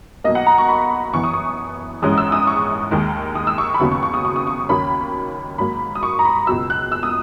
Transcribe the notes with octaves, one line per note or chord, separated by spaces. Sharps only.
B1 B2 A#3 D#5
F#5
A#5
C#6
B5
F#2 E3 B3 C#6
D#6
C#6
A#1 G#2 E3 G#3 C#4 D#6
E6
D#6
C#6
D#2 D#3 G#3
D#6
E6
C#6
B5
D#2 C#3 F#3 B3 C#6
C#6
C#6
D#6
C#6
D#6
C#6
D#2 D#3 F#3 A#3 C#4 B5
G#2 F#3 A#3 B5
D#6
C#6
A#5
B5
C#2 B2 F#3 E6
F#6
E6
D#6